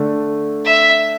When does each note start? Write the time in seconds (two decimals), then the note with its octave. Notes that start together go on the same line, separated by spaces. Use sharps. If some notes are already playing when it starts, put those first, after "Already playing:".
Already playing: D3 A3 D4
0.65 E5